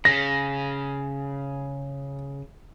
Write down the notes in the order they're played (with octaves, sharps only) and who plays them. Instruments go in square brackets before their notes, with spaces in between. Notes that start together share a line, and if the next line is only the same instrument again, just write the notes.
[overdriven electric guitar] C#3 [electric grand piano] A#6